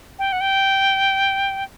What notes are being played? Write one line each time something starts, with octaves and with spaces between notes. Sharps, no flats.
G5
F#5
G5